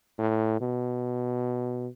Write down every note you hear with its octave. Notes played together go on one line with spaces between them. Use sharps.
A2
B2